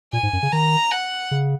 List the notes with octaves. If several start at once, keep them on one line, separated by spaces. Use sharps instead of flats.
A#2 G#5
G#2
F#2
C#3
D#3 A#5
F#5
C#3